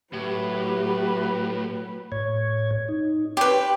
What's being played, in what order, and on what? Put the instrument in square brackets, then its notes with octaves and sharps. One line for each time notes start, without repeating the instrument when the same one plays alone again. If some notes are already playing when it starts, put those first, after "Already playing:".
[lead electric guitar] A2 [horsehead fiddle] F#3 B4 [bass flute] G4
[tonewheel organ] A2 C#5 G#6
D#4
[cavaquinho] G4 B4 [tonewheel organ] C#5 C6